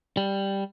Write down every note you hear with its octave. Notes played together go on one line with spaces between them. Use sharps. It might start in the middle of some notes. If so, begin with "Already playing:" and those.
G3